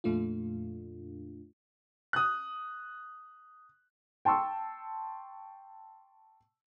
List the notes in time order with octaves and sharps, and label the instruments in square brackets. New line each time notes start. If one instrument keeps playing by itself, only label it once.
[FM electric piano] F2 A#2 A3 D4 F4
[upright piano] D#6 F#6
G5 A5 C6 C#6 E6